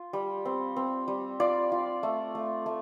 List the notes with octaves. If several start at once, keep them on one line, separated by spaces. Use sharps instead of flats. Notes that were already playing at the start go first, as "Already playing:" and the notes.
Already playing: F4
G3
C4
C4
G3
F4 D5
F4
A3
A3
A3